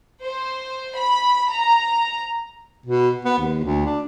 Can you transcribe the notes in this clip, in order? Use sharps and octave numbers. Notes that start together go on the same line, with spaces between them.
C5
B5
A#5
B2
B3
D#2
D2
D4